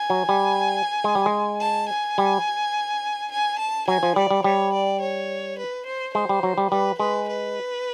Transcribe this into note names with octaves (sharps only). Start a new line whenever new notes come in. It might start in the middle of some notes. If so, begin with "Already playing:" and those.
Already playing: G#5
F#3
G3
G#3
G3
G#3
A5
G#5
G3
G#5
A5
F#3 G#5
F3
G3 D5
G3
G3 C#5
D5
C#5
B4
C5
G#3 C5
G3
F#3
G3
G3 B4
G#3 B4
B4